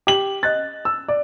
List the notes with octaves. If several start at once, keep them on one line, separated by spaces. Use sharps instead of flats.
G4 F#7
D#5 F#6 A6
E6
D5